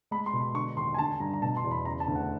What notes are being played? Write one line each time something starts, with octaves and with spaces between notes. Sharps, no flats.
G#3 B5
C6
B2
C6
D3 C#6
D#2 C6
G#5
D3 A5
G2 A#5
A#5
B2 A5
C6
E2
B5
C#3 A#5
A5
D2
F#5